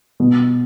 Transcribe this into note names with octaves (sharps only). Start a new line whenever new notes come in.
B2